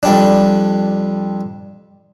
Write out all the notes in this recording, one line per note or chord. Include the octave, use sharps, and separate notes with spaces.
F2 G3 D4